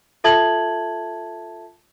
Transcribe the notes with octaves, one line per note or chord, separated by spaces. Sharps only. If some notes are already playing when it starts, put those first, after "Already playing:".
F4 A4 E5 A5 G#6 F#7